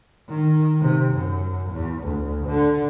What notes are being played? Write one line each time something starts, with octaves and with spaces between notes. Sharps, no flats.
D#3
C3
F#2
E2
D2
D3